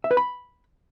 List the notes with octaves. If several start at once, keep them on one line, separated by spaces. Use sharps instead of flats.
E5
B4
B5